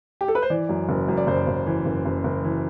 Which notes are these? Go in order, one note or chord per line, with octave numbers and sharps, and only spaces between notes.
G4
A4
B4
C5
E3 D5
F#2
F#1
F#2
D5
F#1 C5
F#1
E3
F#1
F#1
F#1
E3